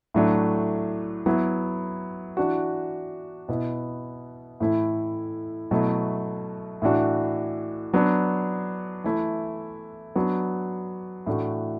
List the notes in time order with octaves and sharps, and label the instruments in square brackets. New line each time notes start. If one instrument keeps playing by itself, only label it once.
[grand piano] A2 F#3 A3 D4
F#3 B3 E4
E3 D4 F#4
B2 B3 E4
A2 E3 A3 E4
B2 F#3 A3 E4
A2 E3 D4 F#4
F#3 B3 D4
E3 A3 E4
F#3 B3 D4 F#4
A2 E3 A3 D4 F#4